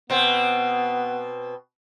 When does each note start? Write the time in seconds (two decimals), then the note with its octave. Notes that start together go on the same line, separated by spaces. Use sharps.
0.10 B2 B3 C4